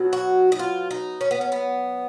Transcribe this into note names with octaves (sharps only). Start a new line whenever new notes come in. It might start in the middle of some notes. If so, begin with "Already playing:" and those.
Already playing: B2 F#3
F#4
D#4
F4
D#4
C#4
B3
C#4
B3